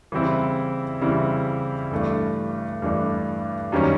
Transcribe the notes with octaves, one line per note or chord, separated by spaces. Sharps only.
C#3 E3 G3 C4 E4
C#3 E3 G3 C4 E4
G2 E3 A3 D4
G2 E3 A3 D4
F#2 D#3 G3 A#3 C#4